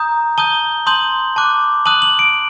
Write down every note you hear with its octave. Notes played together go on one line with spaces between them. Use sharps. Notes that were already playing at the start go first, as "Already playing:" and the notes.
Already playing: A#5 D#6 G6
A5 D#6 G6 G7
A5 C6 D#6 G6 F#7
A5 D6 F#6
A5 D#6 F#6 F#7
F#7
D7